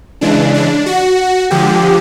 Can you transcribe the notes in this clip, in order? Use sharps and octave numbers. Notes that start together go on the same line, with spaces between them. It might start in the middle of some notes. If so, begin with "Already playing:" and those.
C#3 E3 G#3 D4
D4
F#4
D3 F3 G#3 G4